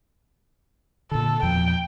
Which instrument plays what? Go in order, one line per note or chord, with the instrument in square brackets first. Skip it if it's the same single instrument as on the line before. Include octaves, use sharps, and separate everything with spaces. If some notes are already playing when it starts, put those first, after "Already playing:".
[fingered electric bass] A#2 D3 [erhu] A4
[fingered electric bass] E2 A#2 F3 [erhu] G5